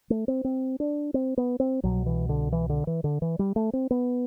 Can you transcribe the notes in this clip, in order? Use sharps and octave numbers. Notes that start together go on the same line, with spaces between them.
A3
C4
C4
D4
C4
B3
C4
C2 B2 F#3
E3
D3
E3
D3
E3
D3
E3
G3
A3
C4
B3